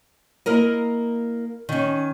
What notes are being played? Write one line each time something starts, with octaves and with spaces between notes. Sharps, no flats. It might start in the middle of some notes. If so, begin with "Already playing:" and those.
A#3 E4 A#4 D#5
D#3 C#4